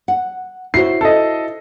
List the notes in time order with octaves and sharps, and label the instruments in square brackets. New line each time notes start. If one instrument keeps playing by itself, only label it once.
[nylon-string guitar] F#5
[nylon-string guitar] E4 F#4 C5 [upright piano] C7
[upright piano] A4 D#5